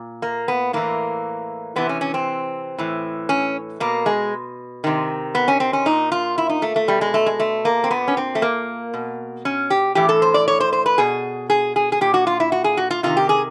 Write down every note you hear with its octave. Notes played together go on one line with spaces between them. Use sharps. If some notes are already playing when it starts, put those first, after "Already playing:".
Already playing: A#2
A#3
B3
A2 E3 A#3
C3 E3 B3
C#4
C#4
C4
A2 E3
C#4
B2 A#3
G#3
C3 D#3
B3
C#4
C4
C#4
A#2 D#4
F4
E4
D#4
A3
A3
B2 G3
G#3
A3
G#3
A3
A#3
C4
A#2 B3
C#4
C4
A3
A#3
B2
C#4
G4
A2 E3 G4
A4
C5
D5
C#5
C5
C5
B4
B2 G#4
G#4
G#4
G#4
A#2 G4
F#4
F4
E4
F#4
G#4
F#4
F4
C3 D#3 F4
G4
G#4